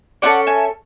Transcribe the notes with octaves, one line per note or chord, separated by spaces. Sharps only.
C#4 E4 A4 D5 F#5
E5 G#5